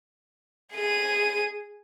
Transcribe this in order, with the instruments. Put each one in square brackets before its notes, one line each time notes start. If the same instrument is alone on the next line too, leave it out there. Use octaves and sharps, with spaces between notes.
[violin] G#4 D#7